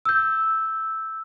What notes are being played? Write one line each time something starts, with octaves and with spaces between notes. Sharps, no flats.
E6 G6